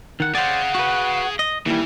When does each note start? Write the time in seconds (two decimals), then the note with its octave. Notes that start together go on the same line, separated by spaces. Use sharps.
0.20 D#3 F#5
0.35 G#4 C5 D5 F5 F#5
0.75 F#4 B4
1.39 D#5
1.66 D#2 E3 G3 E4